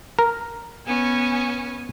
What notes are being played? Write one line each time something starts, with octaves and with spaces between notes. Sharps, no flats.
A#4
B3 C#4 G#5